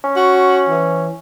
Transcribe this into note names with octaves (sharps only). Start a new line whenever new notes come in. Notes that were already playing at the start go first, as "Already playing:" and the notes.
C#4
F#4
E3